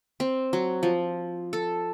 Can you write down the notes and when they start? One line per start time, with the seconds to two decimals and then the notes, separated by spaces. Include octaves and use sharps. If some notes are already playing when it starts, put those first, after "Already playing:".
0.20 C4
0.53 F#3
0.83 F3
1.53 A4